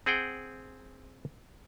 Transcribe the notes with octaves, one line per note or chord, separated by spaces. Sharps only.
C4 G#4 F#5 G5